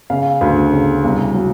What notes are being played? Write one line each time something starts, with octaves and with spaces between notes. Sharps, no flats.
C#3 F5
D2
C#3
C2
F#3